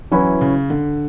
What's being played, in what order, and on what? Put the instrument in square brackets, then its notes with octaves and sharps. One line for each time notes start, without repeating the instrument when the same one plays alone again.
[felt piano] E3 [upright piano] F#3 C#4 E4 B4
[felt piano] C#3
D3